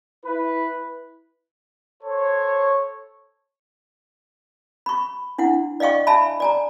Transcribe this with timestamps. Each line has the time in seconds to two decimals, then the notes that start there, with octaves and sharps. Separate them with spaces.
0.24 E4 B4
2.03 A4 C5 C#5
4.86 B5 C#6
5.38 D4 E4 F#5
5.80 D5 D#5 F5 G5 C#6
6.07 E5 G#5 A5 B5
6.40 D5 G#5 A#5